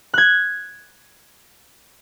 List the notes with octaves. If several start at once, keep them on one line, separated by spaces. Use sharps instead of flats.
F#6 G#6